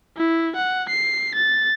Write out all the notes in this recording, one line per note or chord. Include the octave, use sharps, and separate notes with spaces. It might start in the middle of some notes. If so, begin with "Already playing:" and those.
E4
F#5
C7
A6